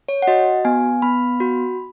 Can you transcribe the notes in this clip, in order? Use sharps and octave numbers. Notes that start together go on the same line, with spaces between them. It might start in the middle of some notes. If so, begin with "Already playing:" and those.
C#5
F#5
F#4 D#5
B3 G#5
B3 B5
F#4